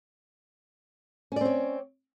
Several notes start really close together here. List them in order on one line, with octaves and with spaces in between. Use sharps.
C#4 D5 C4 C#5